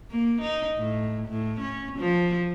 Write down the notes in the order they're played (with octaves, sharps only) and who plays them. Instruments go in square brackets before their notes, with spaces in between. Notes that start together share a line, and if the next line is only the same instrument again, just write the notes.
[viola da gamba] A#3
D#4
A2
A2
C#4
F3